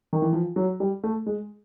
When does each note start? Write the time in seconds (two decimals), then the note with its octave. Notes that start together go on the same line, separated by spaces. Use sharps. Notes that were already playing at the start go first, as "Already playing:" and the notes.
0.13 D#3
0.22 E3
0.33 F3
0.56 F#3
0.80 G3
1.03 A3
1.26 G#3